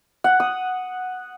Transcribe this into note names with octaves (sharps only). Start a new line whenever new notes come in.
F#5
D#6